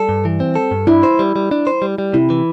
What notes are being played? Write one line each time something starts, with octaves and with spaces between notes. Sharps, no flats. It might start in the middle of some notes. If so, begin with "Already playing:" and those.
Already playing: G3 A4
G2
E3
C4
A4
G2
D4 E4
C5
G3
G3
D4
C5
G3
G3
C3 E4
E3